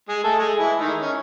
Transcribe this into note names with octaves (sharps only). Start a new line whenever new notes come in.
G#3 G#4
A3 A4
G#3 G#4
E3 E4
D#3 D#4
C#4